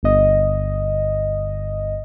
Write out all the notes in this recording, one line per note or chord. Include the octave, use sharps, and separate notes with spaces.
G1 D#5